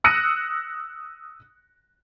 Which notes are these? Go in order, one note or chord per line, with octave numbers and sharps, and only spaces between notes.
D#6 E6 F#6 A#6 C#7 D#7